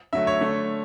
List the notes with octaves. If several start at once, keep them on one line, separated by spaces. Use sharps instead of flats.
D3 F#3 A3 E5
C#5
D3 A3